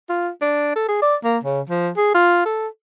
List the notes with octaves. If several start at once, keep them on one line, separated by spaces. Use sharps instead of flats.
F4
D4
A4
G#4
D5
A#3
C#3
F3
G#4
F4
A4